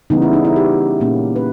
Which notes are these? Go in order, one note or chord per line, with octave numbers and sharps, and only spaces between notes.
C#3 E3 G3 B3 D#4
E4
D#4
E4
G4
A#2 A#3 C#4
B4